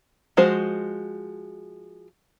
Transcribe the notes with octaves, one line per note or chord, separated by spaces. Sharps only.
F3 G#3 F#4 C5